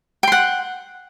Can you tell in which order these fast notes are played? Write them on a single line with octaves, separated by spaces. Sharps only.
G5 C6 F#5